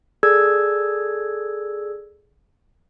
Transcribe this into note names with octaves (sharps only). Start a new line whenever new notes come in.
G#4 A4 D5 E6 G#6